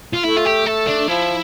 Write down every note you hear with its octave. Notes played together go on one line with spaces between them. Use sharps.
F4
A3 E4
F4
G4
A3 A4
D4
F3 E4